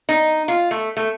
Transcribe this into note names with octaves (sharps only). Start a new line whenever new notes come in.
D#4
F4
A3
A3